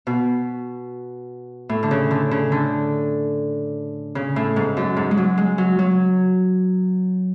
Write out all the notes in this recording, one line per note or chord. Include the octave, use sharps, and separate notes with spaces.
B2
A2
D3
C#3
D3
C#3
D3
C#3
A2
G#2
F#2
G#2
G#3
F#3
G#3
F#3
F#3